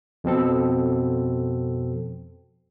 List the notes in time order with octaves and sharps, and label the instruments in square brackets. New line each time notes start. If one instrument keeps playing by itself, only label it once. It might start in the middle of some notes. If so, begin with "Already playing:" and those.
[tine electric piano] F2 B2 C4 A4